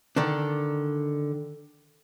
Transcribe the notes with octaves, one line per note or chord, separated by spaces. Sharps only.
D3 D#3 D4